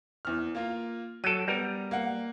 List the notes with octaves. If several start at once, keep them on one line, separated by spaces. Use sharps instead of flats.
E2 F6
A#3 F4
F#3 A4 D7 D#7
G3 B3 A#4
A#3 F#5